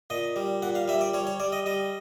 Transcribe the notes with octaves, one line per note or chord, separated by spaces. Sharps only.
A#2 D#5
G3
A#2 F#5
F5
G3 E5
D5
G3 C#5
C#5
G3 D5
D#5
G3 D#5